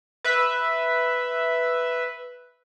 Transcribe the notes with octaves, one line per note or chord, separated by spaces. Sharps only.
B4 E5